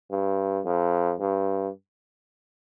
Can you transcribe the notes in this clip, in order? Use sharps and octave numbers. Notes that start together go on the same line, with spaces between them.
G2
F2
G2